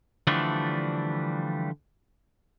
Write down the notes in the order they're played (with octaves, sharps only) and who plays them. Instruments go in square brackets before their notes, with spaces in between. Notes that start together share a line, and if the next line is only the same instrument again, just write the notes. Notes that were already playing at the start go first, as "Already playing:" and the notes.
[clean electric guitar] D3 E3 F3 G3 A3 D4